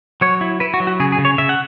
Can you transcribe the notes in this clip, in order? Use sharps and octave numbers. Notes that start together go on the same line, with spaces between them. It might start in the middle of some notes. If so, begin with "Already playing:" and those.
F#3 C#5
E4
E4 B4
F#4
F#3
F#4
C#3 G#4
G#4
C#3
C#5
C#3 E5
F#5